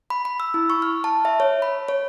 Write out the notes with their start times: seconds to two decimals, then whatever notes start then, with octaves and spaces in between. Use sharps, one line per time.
0.10 B5
0.25 B5
0.40 E6
0.54 E4
0.70 C#6
0.82 F6
1.04 A5
1.25 E5
1.40 C#5
1.62 B5
1.88 C#5